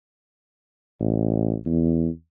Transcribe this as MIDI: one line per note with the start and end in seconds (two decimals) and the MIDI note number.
1.00 1.55 33
1.65 2.08 40